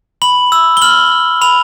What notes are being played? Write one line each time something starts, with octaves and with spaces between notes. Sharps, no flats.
B5 F#7
E6
G7
F6 F#7
F6
B5 F7